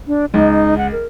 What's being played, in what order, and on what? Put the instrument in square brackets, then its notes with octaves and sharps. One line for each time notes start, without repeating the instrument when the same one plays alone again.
[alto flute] D4
[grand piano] C#2 [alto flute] D#4
[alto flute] F#5
A#4